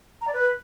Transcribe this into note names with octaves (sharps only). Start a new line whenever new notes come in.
A#5
D5
B4